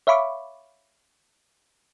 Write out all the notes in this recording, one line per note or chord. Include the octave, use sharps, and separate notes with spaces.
C#5 E5 F5 B5 C#6 D6